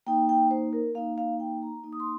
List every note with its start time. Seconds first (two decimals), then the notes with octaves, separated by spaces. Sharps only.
0.06 A#3 D#4 G5
0.29 G5
0.51 C5
0.73 A#4
0.95 A#3 D#4 F5
1.18 F5
1.40 G5
1.62 A#5
1.84 A#3 D#4
1.93 D#6
2.00 C6